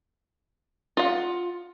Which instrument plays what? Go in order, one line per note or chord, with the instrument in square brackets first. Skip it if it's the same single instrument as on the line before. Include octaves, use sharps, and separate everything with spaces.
[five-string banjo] F4 F#5